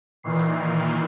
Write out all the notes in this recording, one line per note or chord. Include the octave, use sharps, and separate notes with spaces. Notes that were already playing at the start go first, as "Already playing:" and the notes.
A#2 D#3 E3 C7